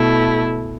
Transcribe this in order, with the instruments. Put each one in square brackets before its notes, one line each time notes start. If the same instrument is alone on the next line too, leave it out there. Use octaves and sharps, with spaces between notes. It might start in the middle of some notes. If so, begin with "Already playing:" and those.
Already playing: [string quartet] B2 A3 E4